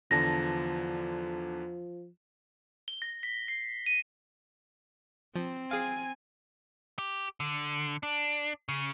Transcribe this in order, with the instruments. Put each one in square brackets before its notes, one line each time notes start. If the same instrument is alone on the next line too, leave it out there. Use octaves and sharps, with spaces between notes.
[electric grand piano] E2 D3 A5 [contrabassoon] F3 [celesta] A#6
[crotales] G7
A#6
B6
C7
D#7
[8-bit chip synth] F3 [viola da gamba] C4
[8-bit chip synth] G#4 F5 [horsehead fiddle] G#5
[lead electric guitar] G4
D3
D4
C#3